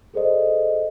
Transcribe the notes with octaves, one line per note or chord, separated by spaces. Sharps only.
G#4 A4 C5 D5 D#5